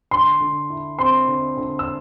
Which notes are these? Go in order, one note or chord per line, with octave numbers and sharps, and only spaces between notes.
D3 C6
D3
E4
C4 C6
D3
D3
E6